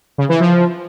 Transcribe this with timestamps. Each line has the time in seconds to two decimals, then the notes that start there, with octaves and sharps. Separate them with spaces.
0.18 C#3
0.29 E3
0.40 F3